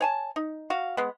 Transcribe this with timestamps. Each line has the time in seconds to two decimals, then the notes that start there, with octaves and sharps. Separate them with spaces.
0.01 C#5 G#5 A5
0.36 D#4
0.70 F#4 F5
0.97 G#3 B3